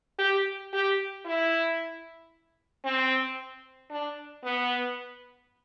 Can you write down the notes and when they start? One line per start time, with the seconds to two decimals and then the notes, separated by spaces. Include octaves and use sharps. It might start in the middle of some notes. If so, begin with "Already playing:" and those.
0.19 G4
0.73 G4
1.25 E4
2.85 C4
3.90 D4
4.43 B3